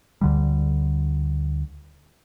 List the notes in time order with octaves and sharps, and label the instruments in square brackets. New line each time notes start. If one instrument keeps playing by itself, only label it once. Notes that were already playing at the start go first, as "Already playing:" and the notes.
[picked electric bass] D2 D3 G3